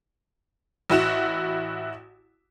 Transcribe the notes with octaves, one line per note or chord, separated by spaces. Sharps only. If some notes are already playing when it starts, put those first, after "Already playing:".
A1 E4 F#4 E7